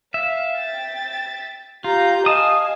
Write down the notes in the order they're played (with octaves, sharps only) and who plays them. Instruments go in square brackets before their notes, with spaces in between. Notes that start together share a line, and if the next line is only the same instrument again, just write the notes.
[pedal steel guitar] E5 [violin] F5
[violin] G5 A6
[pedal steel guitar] F4 [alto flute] G4 [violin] A#5 G6
[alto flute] D#5 [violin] F5 G#5 [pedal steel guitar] A5 D#6